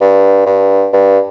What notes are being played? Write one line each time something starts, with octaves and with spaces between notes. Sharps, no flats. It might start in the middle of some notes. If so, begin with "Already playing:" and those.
G2
G2
G2